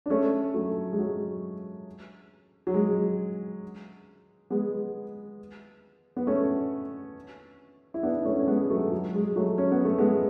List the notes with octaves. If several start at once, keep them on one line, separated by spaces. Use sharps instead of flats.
D4
A3 C#4
F#3 A3
G#3
F#3
F#3
G#3
G#3 B3
B3
A3 C#4
E4
B3 D4
D4
A3 C#4
C#4
G#3 B3
F#3 A3
F#3
G#3
F#3 A3
C#4
B3
A3
G#3 B3